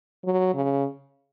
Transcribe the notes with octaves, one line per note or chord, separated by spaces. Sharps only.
F#3
C#3